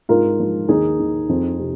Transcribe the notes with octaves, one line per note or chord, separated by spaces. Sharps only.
G#2 F4 A#4
F3
D#2 D#4 G#4
D#3
F2
C3